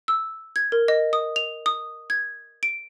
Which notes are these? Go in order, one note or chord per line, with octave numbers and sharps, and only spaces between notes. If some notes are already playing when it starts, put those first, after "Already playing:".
E6
G#6
A#4
D#5
D#6
F7
D#6
G#6
D7